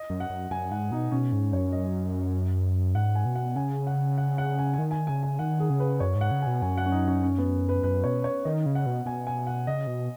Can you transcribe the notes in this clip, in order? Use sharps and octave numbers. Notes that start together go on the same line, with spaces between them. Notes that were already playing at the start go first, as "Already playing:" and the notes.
Already playing: D#5
F#2
F#5
F#2
F#2 G#5
G#2 F#5
B2 D#4
B2 C#4
G#2
F#2 C#5
D#5
G#2 F#5
G#5
B2
F#5
C#3 G#5
F#5
F#5
F#5
G#5
G#5
D#3
G#5
C#3 G#5
G#5
D#3 F#5
G#4
C#3
B4
F#2 C#5
G#2
F#5
C#3
B2 G#5
F#2 G#5
F#5
C#4
D#4
C#4
C#4
B3
B4
F#2 B4
B2 C#5
C#5
D#3 D#5
C#3
F#5
B2
B2 G#5
G#5
F#5
C#3 D#5
B2